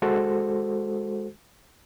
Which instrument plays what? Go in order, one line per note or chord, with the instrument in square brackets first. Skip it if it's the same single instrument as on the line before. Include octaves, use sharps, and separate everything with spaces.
[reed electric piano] G#3 F#4 A4 C5